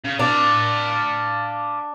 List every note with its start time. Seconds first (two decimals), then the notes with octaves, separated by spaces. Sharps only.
0.05 C#3
0.19 D4 D5 F5